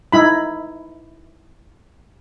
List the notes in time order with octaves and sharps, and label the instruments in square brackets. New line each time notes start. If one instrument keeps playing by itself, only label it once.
[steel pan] D#4 E4 B5